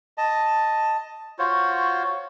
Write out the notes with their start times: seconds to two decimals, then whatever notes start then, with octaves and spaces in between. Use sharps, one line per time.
0.18 D#5 A5
1.39 F4 F#4 C5 C#5